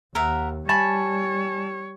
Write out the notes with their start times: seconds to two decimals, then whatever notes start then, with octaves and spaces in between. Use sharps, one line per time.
0.15 D#2 A#4 E5 F#5
0.69 G3 C#5 G#5 A5 B5 C#6